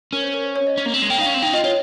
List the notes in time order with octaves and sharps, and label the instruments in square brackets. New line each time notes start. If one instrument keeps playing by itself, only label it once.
[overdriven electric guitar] C#4 [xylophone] A#4
[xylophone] C5
A#4
C5
C#5
D#5
[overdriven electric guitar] C#4
A#3
C4
G#3
[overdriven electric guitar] A#3 [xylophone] G5
[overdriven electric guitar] D#4 [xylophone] F5
[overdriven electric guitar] C#4
C4
[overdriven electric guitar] D#4 [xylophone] G5
[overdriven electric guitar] F4 [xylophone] D#5
[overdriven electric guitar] F4 [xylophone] C#5